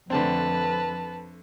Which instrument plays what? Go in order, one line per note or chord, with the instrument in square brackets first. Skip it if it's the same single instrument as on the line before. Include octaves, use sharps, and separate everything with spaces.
[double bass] F2 [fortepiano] D3 A3 C4 [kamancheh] B4 A5